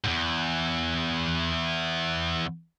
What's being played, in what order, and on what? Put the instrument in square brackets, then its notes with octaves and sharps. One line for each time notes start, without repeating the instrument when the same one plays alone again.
[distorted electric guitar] E2 G#2